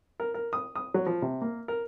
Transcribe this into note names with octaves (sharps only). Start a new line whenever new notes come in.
A#4
A#4
D#6
D#6
F#3
F3
C3
A#3
A#4